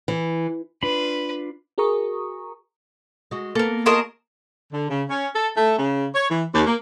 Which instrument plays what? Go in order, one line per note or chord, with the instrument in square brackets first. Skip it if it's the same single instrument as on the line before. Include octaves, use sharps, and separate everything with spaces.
[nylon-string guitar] E3
[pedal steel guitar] D4 F4 B5 [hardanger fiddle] B4
[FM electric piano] F#4 G#4 A#4 A#5 C#6 D#6
[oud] G#3 F#4
[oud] A#3 B3 [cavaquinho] A4 A#4
[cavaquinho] F4 C#5 D#5 [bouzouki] G#4 A#4 A5
[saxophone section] D3
C#3
C#4
A4
A3
C#3
C#5
E3
D#2
A#3